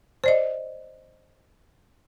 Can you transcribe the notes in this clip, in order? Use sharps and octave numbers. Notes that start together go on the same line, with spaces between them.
C5 D5 D#5